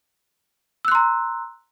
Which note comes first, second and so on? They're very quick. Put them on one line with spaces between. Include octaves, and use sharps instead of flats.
E6 F#6 C6 A#5